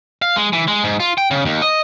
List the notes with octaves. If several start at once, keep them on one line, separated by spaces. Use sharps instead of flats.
F5
G#3
E3
G#3
G#2
F4
G5
C#3
D#2
D#5